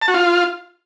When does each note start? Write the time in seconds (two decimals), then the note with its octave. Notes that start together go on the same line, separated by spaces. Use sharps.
0.02 A5
0.08 F#4
0.14 F4